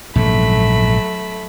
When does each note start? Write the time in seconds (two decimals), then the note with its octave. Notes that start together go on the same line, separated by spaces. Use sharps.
0.15 A#1 G#2 C3 F#3 A3 B5